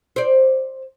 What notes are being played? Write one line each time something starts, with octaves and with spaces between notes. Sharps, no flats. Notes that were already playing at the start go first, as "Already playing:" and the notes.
C5 D5